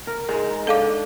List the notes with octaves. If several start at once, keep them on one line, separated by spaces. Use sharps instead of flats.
A#4
G#2 G#3 D#4
D4 A4 F5 D6